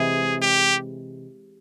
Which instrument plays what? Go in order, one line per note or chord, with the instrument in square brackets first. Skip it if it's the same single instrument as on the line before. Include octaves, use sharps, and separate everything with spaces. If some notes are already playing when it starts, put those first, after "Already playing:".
Already playing: [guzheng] C3 E3 G#3 [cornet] G#4
[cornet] G4